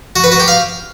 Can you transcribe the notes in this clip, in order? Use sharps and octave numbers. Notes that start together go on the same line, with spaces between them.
F#4
B4
F#4
G4
F5